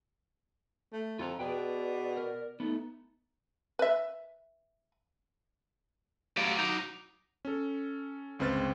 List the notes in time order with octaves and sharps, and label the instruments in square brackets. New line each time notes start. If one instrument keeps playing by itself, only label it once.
[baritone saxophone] A3
[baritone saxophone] F2 [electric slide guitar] F4 A4 A#5
[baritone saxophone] B2 [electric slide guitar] G#4 B4 G5 [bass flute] D5
[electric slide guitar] A#4
[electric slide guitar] A3 B3 [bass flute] D#4
[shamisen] B4 E5
[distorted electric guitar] F#3 D5 [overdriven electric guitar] G4 F5
[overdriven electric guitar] D#4
[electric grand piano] C#4 A4
G1 C#2 C4 B4 F6 A6